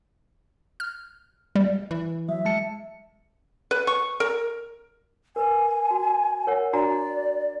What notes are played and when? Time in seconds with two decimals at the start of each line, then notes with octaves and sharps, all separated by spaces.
0.80 F6
1.55 G3
1.91 E3
2.29 F#3 E5
2.45 G#3 A5 C#7
3.71 B4
3.87 C#6
4.20 A#4
5.36 A#4 B4 G#5
5.91 F#4
6.47 A#4 C#5 F#5
6.73 D4 F#4 D5 A#5